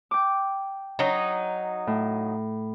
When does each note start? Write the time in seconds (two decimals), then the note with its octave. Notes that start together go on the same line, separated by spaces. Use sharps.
0.11 G5 D6
0.99 F#3 D#4
1.87 A2